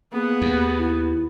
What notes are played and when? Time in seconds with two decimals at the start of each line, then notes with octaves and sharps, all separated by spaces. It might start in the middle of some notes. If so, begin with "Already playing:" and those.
0.13 A#3 B3 G#4 F#5
0.42 D#2
0.78 E4